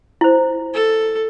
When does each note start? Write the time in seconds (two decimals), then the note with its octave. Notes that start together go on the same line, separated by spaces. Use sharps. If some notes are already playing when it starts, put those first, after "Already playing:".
0.21 E4 C5
0.74 A4